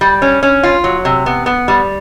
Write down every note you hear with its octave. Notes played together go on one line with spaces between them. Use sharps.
G3
C#4
C#4
F4
F#3
C3
B3
B3
G3